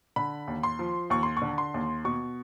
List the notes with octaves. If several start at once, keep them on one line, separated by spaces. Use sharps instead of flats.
D3 B5
D#2
C6
F3
D#2 C#6
C6
C#6
D3
C6
D#2
B2 C#6